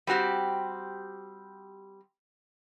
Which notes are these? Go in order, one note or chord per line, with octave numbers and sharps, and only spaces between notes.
G3 C4 F#4 G4